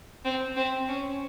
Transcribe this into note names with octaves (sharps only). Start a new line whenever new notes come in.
C4
C4
C#4